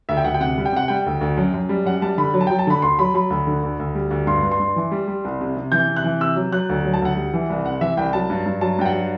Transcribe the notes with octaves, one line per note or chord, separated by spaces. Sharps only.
D2 E5
G5
D2 F#5
G5
C3 F#5
G3
G5
C3 F#5
G3 G5
D2
D2
F#2
F#2
G3
F#2 F#5
G3 A5
D3 B5
F#3
A5
G5
F#3
A5
D3 B5
D2 C6
F#3 B5
F#3 B5
D2
D3
D2
D2
G3
D2
G2 C6
G2
C6
G2
E3
G3
G3
C2
C3
C3
E3 G6
C3
F#6
E3
C3 E6
F#3
F#3 F#6
D2
F#3
A5
D2 F#5
G3
E3
C2
C3 F#5
E3 E5
C2 G5
F#3 A5
G2
G2
F#3 A5
G2 G5
F#5
F#3